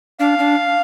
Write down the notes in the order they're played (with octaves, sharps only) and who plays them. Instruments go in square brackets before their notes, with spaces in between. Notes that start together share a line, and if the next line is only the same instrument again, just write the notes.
[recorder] D4 [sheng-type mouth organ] F5
[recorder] D4